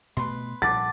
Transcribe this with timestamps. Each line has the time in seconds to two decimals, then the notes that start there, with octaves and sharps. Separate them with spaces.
0.17 B2 A3 B4 C6
0.62 A#1 G3 F#5 A5 D6 A6